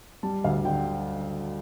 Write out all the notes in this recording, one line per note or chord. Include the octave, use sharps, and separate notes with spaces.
G3 A5
D2 F5
D3 G5